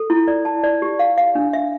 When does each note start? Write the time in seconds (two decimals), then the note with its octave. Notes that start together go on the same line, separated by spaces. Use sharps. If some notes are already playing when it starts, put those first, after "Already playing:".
Already playing: A4
0.10 E4
0.28 D5
0.45 A5
0.64 D5
0.82 G4
0.99 F5
1.18 F5
1.35 D4
1.53 E5